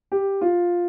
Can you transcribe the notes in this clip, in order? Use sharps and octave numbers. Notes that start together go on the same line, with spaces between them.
G4
F4